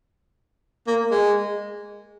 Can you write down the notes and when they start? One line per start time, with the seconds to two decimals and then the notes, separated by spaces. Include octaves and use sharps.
0.87 A#3
1.11 G#3